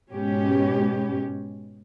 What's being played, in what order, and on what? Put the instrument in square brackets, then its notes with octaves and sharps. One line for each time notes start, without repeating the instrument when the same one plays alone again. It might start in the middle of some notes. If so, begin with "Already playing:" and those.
[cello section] G#2 B2 G#3 C#4 G4